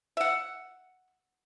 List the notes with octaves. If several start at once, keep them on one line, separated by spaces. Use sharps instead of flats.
E5 F#5